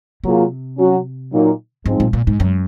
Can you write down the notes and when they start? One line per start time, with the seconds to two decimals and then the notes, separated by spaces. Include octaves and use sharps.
0.24 C3 F#3 A#3 F4 G#4
0.78 F#3 C#4 F#4
1.32 A#2 F#3 A#3 D#4
1.86 G#2 F3 G#3 C4 D#4
2.00 A#2
2.13 A#2
2.27 G#2
2.40 F#2